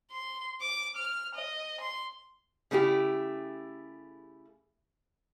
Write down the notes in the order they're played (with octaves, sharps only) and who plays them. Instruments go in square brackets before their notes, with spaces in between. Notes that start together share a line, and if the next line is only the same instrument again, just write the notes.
[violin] C6
D6
F6
D#5
C6
[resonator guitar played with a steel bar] C#3 A3 E4 G4